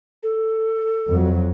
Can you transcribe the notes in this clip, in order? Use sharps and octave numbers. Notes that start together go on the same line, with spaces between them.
A4
F2 F#3